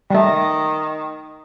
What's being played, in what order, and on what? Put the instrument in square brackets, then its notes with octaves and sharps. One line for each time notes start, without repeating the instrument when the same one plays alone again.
[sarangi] D#3 [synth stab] G3 A3